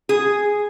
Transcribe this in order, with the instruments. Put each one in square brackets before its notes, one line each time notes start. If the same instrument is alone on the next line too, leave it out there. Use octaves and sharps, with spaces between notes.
[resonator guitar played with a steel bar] G#4